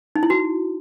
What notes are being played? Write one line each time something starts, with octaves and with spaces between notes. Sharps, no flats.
D#4
E4
F#4